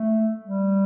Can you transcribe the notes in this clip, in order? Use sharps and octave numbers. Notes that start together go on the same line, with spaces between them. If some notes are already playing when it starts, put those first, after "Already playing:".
Already playing: A3
G3